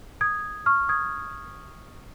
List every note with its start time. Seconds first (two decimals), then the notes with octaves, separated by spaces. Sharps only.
0.21 D#6 G#6
0.66 C#6 F6
0.89 D#6 G#6